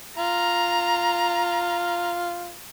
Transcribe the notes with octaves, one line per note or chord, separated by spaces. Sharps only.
F4 A#5